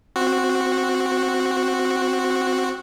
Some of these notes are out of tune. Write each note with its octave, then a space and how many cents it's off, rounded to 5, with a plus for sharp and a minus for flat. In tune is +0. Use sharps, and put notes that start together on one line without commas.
C4 +0 F#4 -10